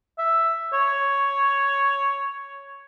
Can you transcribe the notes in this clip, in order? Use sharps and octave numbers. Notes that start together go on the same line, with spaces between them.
E5
C#5